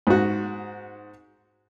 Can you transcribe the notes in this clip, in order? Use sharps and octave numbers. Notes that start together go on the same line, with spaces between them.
G#2 F#4